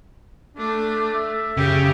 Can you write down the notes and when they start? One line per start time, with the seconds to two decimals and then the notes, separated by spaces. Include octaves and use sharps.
0.57 A3 D4
1.14 E5
1.57 F#2 C#3 G4